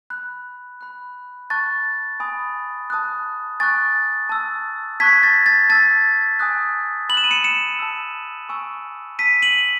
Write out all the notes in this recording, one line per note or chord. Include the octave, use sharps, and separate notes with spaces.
B5 F#6
B5 F#6
A5 C#6 F#6 A6
G#5 B5 D#6
A5 D#6 F#6
G#5 C#6 F#6 A6
A5 E6
A5 C#6 F#6 G#6 B6
A6
A6
A5 E6 A6
G#5 D#6 F#6
B5 F#6 E7 F#7
D#7
C#7 E7
C#7 E7
A5 E6
G#5 C#6 E6
A5 E6 B6 D#7
D#7 F#7